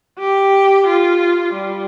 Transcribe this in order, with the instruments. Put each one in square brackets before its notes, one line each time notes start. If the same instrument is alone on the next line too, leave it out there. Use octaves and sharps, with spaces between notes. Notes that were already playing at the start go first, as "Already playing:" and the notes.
[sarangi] G4
F4
G3